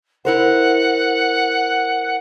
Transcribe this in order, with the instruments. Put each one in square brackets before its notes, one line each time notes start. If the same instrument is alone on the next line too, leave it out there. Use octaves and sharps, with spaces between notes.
[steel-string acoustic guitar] E4 A#4 C5 [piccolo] F#5